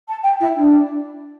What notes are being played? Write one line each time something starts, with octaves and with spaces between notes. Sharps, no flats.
A5
G5
E4
D4